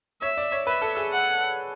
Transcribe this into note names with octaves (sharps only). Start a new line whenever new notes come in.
C#5 E5
D5
C#5
B4 E5
A4
G#4
F#5